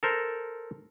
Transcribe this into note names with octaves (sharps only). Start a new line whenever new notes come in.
A4 A#4 C5